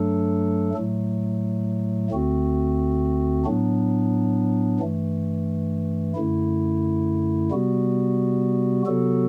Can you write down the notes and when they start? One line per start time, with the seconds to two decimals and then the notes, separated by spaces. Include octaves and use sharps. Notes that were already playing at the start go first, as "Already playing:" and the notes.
Already playing: G2 F#3 A3 D4 A4
0.74 A2 F#3 A3
2.10 D2 D3 A3 C4 F#4
3.45 A2 F#3 B3 D4
4.80 G2 E3 A3
6.15 F#2 D3 A3 E4
7.51 C3 G3 B3 F#4
8.86 C3 F#3 B3 F#4 A4